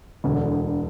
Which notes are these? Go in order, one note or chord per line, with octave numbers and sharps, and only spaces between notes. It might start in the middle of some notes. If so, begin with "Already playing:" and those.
E1 D2 D3